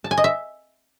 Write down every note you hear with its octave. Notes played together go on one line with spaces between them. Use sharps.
A5
G#5
D#5
E5